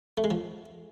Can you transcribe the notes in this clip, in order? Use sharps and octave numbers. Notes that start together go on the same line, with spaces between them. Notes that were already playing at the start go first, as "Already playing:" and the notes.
A3
G#3
F3